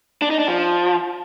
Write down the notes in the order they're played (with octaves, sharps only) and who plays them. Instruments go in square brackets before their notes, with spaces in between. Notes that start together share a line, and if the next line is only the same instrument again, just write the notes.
[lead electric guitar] D4
D#4
D4
F3